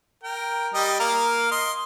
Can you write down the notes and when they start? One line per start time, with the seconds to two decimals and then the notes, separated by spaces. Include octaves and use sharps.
0.23 A#4 G5
0.74 G3 D#5 G5
1.00 A#3 A#4 F5
1.51 D#5 C6